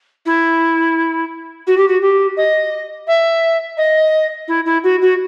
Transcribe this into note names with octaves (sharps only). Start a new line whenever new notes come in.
E4
F#4
G4
F#4
G4
D#5
E5
D#5
E4
E4
F#4
F#4